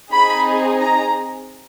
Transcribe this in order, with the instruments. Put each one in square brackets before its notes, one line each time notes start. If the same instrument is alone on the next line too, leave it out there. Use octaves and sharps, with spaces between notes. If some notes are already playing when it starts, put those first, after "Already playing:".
[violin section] C4 D#4 G#4 B5
A#5